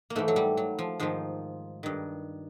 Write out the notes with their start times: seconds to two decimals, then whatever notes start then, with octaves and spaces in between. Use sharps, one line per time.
0.10 A#3
0.15 G#2 E3 A3
0.28 F#3
0.36 G3
0.57 F#3
0.79 F3
1.00 G#2 D#3 F3
1.83 G2 D#3